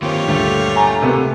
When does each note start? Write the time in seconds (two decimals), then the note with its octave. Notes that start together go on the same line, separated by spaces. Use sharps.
0.02 D#3 A#3 C4 F4 G4 C#5
0.28 D2 G2 A#2 A3
0.76 G#5 A#5
1.02 C3 A#3 B3